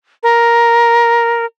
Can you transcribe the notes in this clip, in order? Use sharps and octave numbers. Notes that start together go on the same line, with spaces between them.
A#4